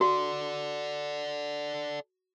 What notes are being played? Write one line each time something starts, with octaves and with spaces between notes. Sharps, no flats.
F#4 A4 D5